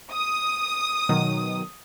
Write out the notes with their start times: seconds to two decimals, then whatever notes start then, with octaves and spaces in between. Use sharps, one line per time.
0.11 D#6
1.09 B2 D#3 F#3